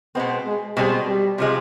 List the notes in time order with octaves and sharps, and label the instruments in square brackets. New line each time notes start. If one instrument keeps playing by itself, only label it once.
[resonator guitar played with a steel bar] B2 G#3 C4 [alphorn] B3
[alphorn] G#3
[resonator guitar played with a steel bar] B2 G#3 C4 [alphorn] G3
[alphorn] G3
[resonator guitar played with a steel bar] C3 F3 G#3 C4